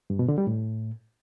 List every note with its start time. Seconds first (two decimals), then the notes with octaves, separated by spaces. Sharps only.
0.10 G2
0.19 B2
0.28 D3
0.38 G3
0.47 A2